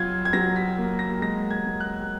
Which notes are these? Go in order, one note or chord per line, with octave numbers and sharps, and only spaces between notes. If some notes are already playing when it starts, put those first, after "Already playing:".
Already playing: F#3 F4 G#6
G#6
F#3 A#6
B6
A#3
A#6
G#3 A#6
G#6
G#3
F#6